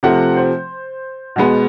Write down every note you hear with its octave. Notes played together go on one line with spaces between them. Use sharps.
C3 F3 A3 C4 F#5
C5
B2 G#3 B3